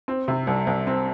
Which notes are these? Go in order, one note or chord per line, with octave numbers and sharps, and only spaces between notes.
C4
C3
C2
C2
C4